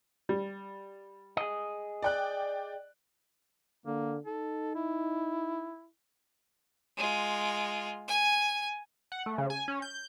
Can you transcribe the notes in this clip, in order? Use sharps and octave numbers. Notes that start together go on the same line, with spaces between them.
G3
G#4 D#5
D5 G5 F#6
D3 A#3
D#4 A4
E4
G#3 F4
G#5
F#5
A3
C#3
G#5
C#4
G6